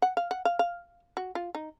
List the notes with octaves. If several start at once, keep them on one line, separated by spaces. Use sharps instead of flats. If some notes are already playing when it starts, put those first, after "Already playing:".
F#5
F5
F#5
F5
F5
F#4
F4
D#4